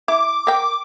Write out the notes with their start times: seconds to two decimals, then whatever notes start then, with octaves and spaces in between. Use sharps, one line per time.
0.08 E4 D6
0.47 A#4 G5